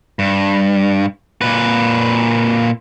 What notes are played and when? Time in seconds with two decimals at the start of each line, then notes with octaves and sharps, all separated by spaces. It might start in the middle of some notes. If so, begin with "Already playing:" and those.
0.19 G2
1.41 A#2 B4